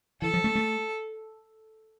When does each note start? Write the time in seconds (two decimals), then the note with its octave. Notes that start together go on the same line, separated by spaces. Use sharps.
0.22 E3 A4
0.34 F3
0.44 A3
0.55 A3